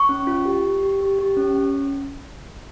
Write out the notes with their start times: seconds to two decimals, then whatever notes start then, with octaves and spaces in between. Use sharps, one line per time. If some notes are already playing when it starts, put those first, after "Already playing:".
Already playing: C#6
0.09 C#4
0.27 F4
0.45 G4
0.64 G4
0.83 G4
1.01 G4
1.19 G4
1.37 C#4
1.55 C#4